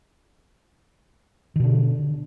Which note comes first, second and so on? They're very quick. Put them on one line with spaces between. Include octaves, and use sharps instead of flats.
D#3 B2 D3